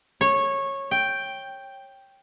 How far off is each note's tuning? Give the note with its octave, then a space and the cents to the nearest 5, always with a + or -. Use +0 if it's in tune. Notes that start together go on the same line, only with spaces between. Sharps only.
C#5 -15
G5 +0